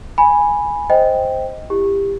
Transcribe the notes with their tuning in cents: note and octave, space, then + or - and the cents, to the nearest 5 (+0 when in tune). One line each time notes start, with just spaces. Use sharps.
G#5 -5 B5 -10
C5 +0 D#5 +10 G5 +0
E4 +25 G4 +20